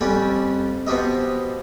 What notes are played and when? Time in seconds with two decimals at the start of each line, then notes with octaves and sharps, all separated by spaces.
0.01 F2 G3 C#4 G4
0.87 B2 F3 G4 D#5